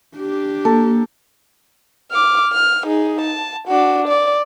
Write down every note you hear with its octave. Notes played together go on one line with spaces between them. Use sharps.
D4 G4
A#3 A4
D6 F6
F6
D#4 G#4
A5
D4 F#4
D5